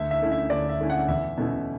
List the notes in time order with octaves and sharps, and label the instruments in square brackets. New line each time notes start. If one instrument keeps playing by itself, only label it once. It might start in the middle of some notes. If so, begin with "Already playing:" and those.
Already playing: [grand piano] D2 E5
E5
D3 A3 C#4 E4
E5
D2 D5
E5
D3 A3 C#4 E4
F#5
E2 E5
B2 A3 C#4 E4